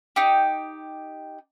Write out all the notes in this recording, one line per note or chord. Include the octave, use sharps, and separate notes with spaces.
D#4 G4